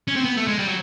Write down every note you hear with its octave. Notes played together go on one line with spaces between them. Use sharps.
C#4
C4
B3
A3
G#3
G3
F#3